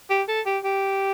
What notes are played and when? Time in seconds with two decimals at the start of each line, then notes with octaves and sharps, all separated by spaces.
0.09 G4
0.28 A4
0.46 G4
0.64 G4